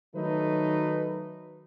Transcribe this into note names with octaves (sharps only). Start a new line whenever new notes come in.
D#3 F#3 A3 D#4 A4 B4